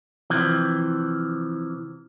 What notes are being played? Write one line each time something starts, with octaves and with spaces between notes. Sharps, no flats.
C3 E3 F3